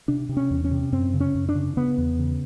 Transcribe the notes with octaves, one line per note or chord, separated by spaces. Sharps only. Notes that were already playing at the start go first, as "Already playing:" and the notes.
C3 D4
C3
C#4
E2
C#4
C3
F#2 C4
C#3
C#4
F#2
D4
C#3
C#3 B3
E2
C#3